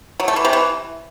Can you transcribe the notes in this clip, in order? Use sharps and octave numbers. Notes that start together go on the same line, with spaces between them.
F#3
A3
E3
C3
E3